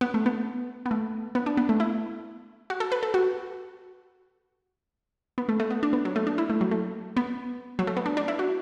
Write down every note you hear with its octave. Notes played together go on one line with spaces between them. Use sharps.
B3
A3
B3
B3
A3
B3
D4
B3
A3
E4
F#4
A4
B4
A4
F#4
B3
A3
A3
B3
D4
B3
F#3
A3
D4
E4
A3
F#3
A3
B3
F#3
A3
B3
D4
D4
E4
F#4